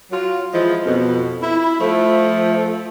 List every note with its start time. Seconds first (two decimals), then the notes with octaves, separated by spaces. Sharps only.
0.11 F#3 F4
0.52 E3 F3 G#3 E4
0.85 F2 B2
1.42 E4
1.80 F3 A3